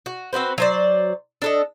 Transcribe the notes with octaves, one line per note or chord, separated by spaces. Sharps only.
F#4
C4 F#4 B4 C5
F#3 C5 D5
D4 A4 D#5